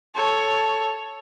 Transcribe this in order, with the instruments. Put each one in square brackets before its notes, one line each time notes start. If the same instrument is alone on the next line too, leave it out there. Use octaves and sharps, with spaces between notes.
[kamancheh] A4 C#5